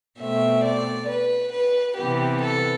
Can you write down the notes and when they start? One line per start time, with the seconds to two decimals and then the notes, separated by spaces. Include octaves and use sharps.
0.19 B2 A3 C4 E5
0.64 D5
1.08 B4
1.53 B4
1.97 C3 E3 B3 G4
2.41 A4